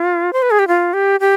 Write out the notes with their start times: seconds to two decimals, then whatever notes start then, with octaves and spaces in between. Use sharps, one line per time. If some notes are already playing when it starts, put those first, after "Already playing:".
Already playing: F4
0.33 C5
0.42 B4
0.51 G#4
0.59 G4
0.68 F4
0.93 G4
1.20 G4